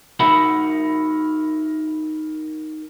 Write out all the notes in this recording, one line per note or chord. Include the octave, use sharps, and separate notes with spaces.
D#4 F#4 A#4 E5 F#5 B5